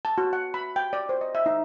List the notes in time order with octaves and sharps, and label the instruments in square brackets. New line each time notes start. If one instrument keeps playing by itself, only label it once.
[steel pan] A5
F#4
F#5
B5
G5
D5
C5
D#5
E5
D#4